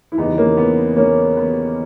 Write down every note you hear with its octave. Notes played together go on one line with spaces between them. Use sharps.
E4
E2 C#3 E3 G3 B3 D#4
A#3 C#4
B3
A#3 C#4
B3